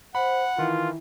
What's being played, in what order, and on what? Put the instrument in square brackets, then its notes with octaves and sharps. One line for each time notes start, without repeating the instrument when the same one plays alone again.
[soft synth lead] C5 [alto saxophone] F#5 [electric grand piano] B5
[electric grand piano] D#3 E3 [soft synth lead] E4 [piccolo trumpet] F4